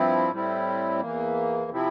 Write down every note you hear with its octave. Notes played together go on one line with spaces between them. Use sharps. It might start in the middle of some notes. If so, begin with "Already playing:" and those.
Already playing: G2 F3 C4 E4
A2 G3 C4 E4
E2 E3 A#3
C3 F3 C4 E4